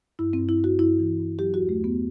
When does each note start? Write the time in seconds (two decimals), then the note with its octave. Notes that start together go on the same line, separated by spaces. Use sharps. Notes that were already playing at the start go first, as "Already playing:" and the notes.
0.19 G2 E4
0.33 C4
0.39 G2
0.49 E4
0.58 G2
0.64 F#4
0.79 G2 E4
0.99 E3
1.19 G2
1.39 F#3 G4
1.54 E2 F#4
1.69 A3
1.79 E2
1.84 B3